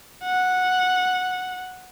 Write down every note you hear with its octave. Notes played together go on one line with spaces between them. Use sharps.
F#5